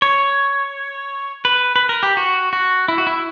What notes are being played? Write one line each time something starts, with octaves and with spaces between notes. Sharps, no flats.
C#5
B4
B4
A#4
G4
F#4
F#4
E4
F#4
E4